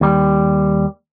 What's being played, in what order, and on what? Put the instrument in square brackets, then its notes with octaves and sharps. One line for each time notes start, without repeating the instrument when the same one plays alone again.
[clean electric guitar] D#2 G3